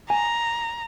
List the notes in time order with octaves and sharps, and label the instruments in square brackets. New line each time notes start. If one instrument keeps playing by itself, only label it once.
[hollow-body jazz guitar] G#5 [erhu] A#5